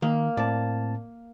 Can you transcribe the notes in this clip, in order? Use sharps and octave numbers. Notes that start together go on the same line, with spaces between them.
D#3 A#3
A2 C4 D5 A5